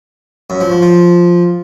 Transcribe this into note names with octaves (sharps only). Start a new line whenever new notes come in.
F#2
F3
F3
F3